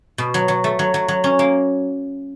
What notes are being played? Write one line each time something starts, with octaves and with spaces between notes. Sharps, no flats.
B2
F#3
F#3
A3
F#3
F#3
F#3
C#4
A#3